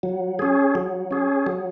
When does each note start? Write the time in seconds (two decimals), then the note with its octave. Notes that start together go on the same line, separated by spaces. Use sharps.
0.03 F#3
0.39 C#4 G#4
0.75 F#3
1.11 C#4 G#4
1.47 F#3